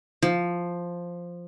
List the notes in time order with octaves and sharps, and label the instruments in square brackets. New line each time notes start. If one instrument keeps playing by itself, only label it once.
[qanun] F3